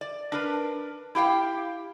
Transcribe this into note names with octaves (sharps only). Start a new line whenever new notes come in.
D5
D4 A#4 B4
E4 G4 F5 G5